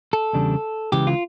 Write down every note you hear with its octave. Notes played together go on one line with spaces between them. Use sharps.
A4
E2 C#3 G3 D4
C#2 C#3 E3 G4
F4